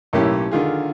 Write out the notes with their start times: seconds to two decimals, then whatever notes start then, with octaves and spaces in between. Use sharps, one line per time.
0.13 B1 A2 A#3 C#4 E4 G4
0.51 D3 D#3 F4 G#4